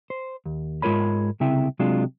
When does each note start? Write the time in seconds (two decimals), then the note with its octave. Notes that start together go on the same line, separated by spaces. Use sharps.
0.10 C5
0.46 D#2
0.82 G#2 G#3 F4 A#4 C#5 B5
1.40 C2 C#3 C4 E4 E5 G5
1.79 C3 F#3 G#3 D4 F4